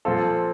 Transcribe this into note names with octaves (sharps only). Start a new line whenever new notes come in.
A#2 F3 C4 F4 A4